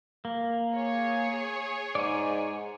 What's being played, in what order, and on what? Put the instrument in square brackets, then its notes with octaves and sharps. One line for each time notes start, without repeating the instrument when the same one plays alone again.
[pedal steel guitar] A#3
[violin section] G#4 C#5
[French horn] G#2 [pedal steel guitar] D5 G#5